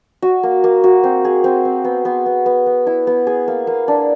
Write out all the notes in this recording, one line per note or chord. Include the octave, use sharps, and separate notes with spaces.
F#4
A#3
A#3
F#4
C4
G#4
C4
C4
B3
B3
B3
B3
B3
E4
B3
G#4
A#3
A#3
D4